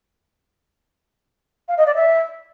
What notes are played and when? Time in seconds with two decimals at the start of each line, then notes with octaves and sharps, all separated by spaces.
1.68 F5
1.77 D#5
1.86 D5
1.96 E5